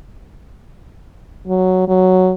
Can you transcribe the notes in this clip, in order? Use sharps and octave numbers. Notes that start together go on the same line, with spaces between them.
F#3
F#3